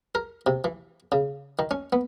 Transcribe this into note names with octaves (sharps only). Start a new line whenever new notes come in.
A#4
C3
E3
C#3
D#3
C#4
B3